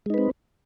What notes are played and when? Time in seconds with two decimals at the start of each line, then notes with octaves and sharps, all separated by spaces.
0.06 G#3
0.10 D#4
0.14 B4
0.18 C4